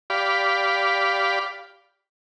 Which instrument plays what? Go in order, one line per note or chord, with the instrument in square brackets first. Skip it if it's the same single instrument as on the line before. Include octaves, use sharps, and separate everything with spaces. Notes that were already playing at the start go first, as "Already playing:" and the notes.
[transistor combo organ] G4 D5 F5 B5